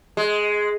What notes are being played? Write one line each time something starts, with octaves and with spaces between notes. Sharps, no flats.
G#3